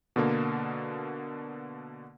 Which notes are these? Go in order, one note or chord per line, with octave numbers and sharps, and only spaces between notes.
B2 D3 A#3